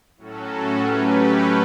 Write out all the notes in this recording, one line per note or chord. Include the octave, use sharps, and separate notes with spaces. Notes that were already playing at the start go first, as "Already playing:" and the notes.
A2 F#3 C#4 F#4 A4
F#3 A3 C#4 G4 B4